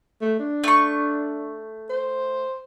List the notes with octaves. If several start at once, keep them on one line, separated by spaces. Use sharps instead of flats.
A3
D4
A3 C#6
C5